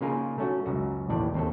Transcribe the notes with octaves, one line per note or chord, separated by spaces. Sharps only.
C#3 A#3 D#4 F4 G#4 A#4
A3 C#4 F#4
C#2 F#2 F#4
A1 D#2 A2 D5
D#2 C4 A4